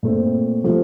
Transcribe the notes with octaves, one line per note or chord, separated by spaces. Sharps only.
A#2 A3 C4
C3 F3 A3